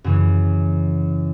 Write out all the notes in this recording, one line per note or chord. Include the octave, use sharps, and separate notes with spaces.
F#2 C#3 E3